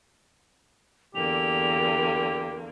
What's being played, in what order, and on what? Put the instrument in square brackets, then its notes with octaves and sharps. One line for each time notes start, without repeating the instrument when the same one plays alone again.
[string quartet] E2 D3 A#3 [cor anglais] G4 [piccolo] F7